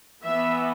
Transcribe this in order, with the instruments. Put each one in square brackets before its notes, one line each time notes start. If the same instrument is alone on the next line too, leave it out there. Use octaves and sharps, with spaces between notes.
[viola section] E3 B3 E5